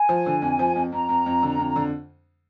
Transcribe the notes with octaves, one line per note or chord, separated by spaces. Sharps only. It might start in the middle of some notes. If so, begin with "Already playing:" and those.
Already playing: G#5
F3
D3
F2
F3
F2
F2 A#5
F2
F2
D3
F2
D3